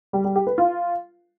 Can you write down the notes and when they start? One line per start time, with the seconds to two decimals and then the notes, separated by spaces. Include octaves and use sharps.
0.13 G3
0.24 G3
0.36 G4
0.47 B4
0.58 F4